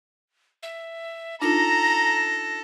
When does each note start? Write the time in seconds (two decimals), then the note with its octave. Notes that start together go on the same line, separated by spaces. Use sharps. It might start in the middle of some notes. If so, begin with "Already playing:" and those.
0.63 E5
1.42 D4 D#4 F4 A4 A#5 A#6